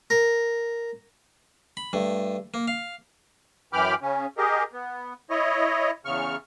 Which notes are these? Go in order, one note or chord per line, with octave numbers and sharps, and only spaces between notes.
A#4
B5
G2 A3
A#3
F5
F#2 E3 G5 B5 D6 F6
C#3 C#4
G4 G#4 A#4 D#5
B3
E4 C#5 D#5
E2 C#3 C#6 F6